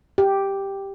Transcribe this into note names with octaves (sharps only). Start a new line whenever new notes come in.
G4